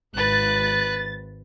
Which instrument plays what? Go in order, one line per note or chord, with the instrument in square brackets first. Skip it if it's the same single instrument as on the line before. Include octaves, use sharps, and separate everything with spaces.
[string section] G#1 A6 [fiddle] B4 F#6